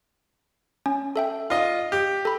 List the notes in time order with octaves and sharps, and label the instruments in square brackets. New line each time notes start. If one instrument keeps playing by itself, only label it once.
[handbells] C#4
A4 E5 G5
[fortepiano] F4 D#5
G4
[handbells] A4 B5